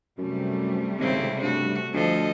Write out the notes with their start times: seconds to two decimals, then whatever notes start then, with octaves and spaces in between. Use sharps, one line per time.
0.19 F#2 C3 G3 A3
0.99 G#1 C#3 C4 E4
1.42 G2 F#4
1.94 D2 F3 A4 D#5